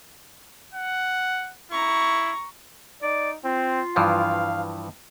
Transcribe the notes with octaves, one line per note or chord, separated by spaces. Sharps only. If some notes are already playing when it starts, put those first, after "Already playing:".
F#5
E4 A#5 C#6
D#4 D5
C4 F4
G2 E3 F3 F5